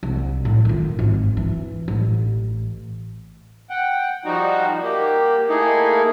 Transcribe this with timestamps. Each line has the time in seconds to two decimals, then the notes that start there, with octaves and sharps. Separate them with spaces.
0.03 C2
0.45 A2
0.65 D#3 F4
0.99 G#1
1.37 E3
1.88 A1
3.70 F#5 G5
4.25 F3 G3 D#4 F#4
4.82 A#3 G4
5.49 A3 A#3 D#4 E4 G#4